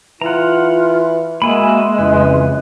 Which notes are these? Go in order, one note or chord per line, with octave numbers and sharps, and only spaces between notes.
E3 F4 F#5 A#5
G#3 A#3 F#4 E5 G#5 B5
F2 C#3 E3 B4